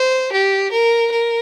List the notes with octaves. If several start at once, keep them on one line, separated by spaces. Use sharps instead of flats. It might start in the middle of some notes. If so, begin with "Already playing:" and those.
Already playing: C5
G4
A#4
A#4